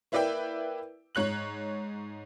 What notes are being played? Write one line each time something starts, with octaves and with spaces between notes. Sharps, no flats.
A#3 E4 B4 D5 E5 G5
G#2 C#5 F#6 F#7